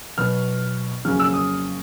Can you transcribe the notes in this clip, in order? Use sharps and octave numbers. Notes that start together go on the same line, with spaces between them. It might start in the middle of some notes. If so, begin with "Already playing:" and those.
B2 F#3 B3 F6
F2 C#3 F#3 A#3 C#4 F6
E6
D#6